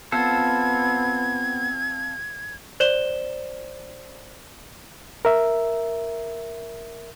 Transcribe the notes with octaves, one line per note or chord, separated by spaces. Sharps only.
B3 C4 F4 A4 G#6
C5 D5 E7 G7
A#4 E5